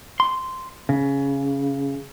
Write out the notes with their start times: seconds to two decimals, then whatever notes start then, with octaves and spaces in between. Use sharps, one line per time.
0.20 C6
0.89 C#3